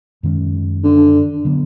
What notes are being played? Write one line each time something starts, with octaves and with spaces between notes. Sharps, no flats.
F#2 D#3 G#3 C#4
D3
D3 F#3 B3